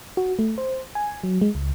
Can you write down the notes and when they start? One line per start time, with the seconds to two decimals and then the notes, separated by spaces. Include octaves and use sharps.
0.17 F#4
0.39 A3
0.58 C5
0.95 G#5
1.24 F#3
1.41 G#3
1.55 C#2